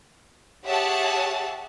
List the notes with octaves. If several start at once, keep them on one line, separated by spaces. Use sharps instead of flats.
G4 G#4 C#5 E5 F#5 A5